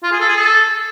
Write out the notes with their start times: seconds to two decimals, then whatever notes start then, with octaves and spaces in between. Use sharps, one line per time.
0.03 F4
0.11 G#4
0.20 A4
0.28 G#4
0.37 A4